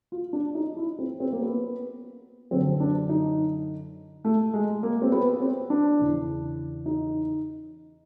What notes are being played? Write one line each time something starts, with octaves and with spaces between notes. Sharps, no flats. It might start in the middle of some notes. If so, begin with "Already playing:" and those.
F4
D4
D#4
E4
C4
C4
A#3
B3
F#2 D3 C4
D4
D#4
A3
G#3
A#3
C4
B3
C4
D4
E2 C#3 E3
D#4